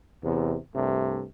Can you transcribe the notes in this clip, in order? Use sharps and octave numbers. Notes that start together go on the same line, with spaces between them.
E2 C3
C2 G2 C3 A3